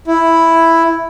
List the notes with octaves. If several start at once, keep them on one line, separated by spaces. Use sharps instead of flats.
E4